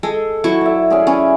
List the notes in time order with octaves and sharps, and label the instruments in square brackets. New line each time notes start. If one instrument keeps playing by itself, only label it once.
[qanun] G#3 [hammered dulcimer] A4
[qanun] F#3 E4 C#6 [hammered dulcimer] B5
[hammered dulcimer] D5 E5
C#4 G#4 D5
[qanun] C#4 [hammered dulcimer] E4